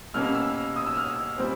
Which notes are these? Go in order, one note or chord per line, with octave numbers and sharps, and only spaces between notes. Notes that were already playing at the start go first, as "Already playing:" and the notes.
B2 G3 A#3 C#4 F6
F6
E6
D#6
E6
F6
A#2 G3 C4